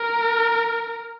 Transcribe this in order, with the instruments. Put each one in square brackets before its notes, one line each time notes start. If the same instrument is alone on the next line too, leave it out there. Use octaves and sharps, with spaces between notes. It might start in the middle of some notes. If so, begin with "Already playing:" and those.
Already playing: [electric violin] A#4